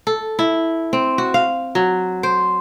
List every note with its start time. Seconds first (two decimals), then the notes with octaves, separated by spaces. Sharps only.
0.07 A4
0.39 E4
0.93 C4
1.18 F#4
1.34 F5
1.75 F#3
2.23 C5